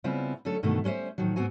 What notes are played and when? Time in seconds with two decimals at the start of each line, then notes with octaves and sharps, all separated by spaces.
0.04 C#3 G3 B3 C4 E4 F4
0.45 D3 F#3 A3 C#4 A4
0.63 G2 B2 D3 D#3 A3
0.84 G3 C#4 B4 C5 E5
1.18 A2 D#3 F3 F#3
1.36 D2 G#2 B3 C4 F#4 G#5